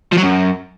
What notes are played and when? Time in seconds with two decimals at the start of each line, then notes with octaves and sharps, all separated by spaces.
0.12 F3
0.17 F#3
0.23 F#2